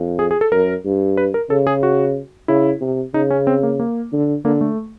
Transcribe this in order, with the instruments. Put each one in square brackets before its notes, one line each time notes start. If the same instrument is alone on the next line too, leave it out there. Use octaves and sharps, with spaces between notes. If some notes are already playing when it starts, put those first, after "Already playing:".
Already playing: [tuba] F2
[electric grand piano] G#4
G#4
A4
[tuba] F#2 [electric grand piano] A#4
[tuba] G2
[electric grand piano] B4
A#4
[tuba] C#3 [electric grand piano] A4
[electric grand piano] G#4
F#4
[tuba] C#3 [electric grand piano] E4
[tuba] C3
[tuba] C#3 [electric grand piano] D#4
[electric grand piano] C#4
C4
A#3
A#3
[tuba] D3
[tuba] D3 [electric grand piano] A#3
[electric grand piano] A3